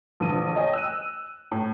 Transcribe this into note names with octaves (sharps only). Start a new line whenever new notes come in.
A#1 D3 E3 D#6 D#7
C#5 D#5 G5 G#5
E6 F#6 D#7
A2